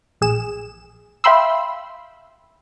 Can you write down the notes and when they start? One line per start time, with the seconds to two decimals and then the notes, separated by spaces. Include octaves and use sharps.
0.21 A#1 G#4 E7
1.24 E5 F5 G5 B5 C6 E6